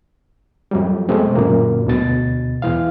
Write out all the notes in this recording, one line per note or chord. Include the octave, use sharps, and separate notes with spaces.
F2 F#3 G3
B2 G#3 A3 C4
F#2 A#2 D3 A#3
D2 B2 A6
E2 E3 F5